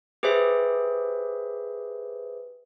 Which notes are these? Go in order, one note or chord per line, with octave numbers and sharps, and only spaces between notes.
G4 G#4 B4 C5 E5